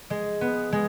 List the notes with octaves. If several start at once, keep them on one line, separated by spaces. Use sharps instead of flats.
G#3
B3
G#3